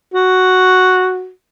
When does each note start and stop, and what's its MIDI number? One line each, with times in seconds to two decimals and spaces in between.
0.14 1.31 66